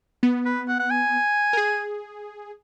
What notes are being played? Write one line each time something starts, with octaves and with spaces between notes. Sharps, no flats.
B3
B4
F#5
F#5
G#5
A#4
G#4